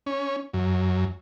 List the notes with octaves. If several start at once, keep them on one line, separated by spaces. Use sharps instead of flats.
C#4
F#2